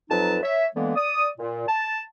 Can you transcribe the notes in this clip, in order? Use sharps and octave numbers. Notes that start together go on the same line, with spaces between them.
F2 F#3 D#4 B4 A5
C#5 E5
D3 E3 G#3 A#3 B3
D5 D#6
A#2
A5